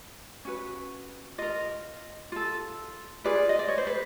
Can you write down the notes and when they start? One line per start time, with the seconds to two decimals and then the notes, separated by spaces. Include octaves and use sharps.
0.45 C#4 F#4 B4
1.38 F4 A#4 D#5
2.32 F4 A4
3.24 F4 G#4 B4 D5
3.49 D#5
3.59 D5
3.68 C#5
3.78 C5
3.87 B4